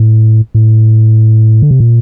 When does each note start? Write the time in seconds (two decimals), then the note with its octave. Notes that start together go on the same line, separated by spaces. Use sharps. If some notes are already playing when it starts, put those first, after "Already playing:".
Already playing: A2
0.55 A2
1.62 D3
1.71 C3
1.80 A#2